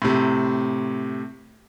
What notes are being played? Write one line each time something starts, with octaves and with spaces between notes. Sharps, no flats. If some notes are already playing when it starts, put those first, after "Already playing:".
A2 C3